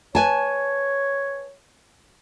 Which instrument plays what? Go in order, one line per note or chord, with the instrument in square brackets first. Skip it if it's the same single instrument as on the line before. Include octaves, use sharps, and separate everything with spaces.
[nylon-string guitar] B4 G#5 A5 [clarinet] C#5